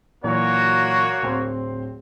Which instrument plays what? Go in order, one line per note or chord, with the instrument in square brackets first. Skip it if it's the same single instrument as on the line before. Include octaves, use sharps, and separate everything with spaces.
[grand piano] A#2 E3 F#3 [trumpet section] A#3 F#4 C#5
[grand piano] D1 C4 C6